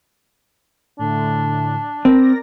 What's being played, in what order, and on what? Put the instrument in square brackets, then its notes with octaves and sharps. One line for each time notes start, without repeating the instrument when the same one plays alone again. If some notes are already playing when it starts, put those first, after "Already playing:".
[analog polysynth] A2 D3 [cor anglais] D4
[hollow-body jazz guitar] C4 [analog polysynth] A#4 D5 A#6